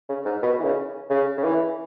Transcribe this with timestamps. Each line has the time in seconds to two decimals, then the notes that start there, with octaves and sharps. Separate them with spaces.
0.09 C#3
0.25 G#2
0.43 B2
0.60 E3
0.64 C#3
1.10 C#3
1.38 C#3
1.44 E3